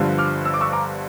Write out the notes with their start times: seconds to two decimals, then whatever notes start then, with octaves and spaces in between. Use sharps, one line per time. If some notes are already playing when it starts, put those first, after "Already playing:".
Already playing: G1 G2 D3 F3
0.18 D6 F6
0.45 E6
0.54 D6
0.61 C#6 E6
0.72 A#5 D6